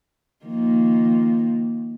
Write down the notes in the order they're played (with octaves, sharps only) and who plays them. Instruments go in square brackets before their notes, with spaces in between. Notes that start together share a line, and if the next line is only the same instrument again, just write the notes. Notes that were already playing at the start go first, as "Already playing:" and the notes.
[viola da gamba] D#3 F3 A#3